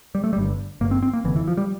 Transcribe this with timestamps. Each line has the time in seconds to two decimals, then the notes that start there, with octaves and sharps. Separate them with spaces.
0.15 G3
0.24 A3
0.33 G3
0.37 G1 G2 D3
0.81 G1 G2 D3 A#3
0.91 C4
1.03 C4
1.13 A#3
1.24 F1 F2 D3 E3
1.36 E3
1.48 F3
1.57 G3